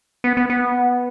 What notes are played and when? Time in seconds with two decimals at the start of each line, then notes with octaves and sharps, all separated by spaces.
0.24 B3
0.37 B3
0.50 B3